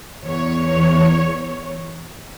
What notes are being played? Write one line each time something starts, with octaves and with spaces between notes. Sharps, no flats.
E2 C#5